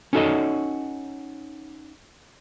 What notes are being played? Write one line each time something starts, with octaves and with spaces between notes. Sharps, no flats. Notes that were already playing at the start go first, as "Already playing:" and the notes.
C#4 D#4 F#4 A4 C#5 D#5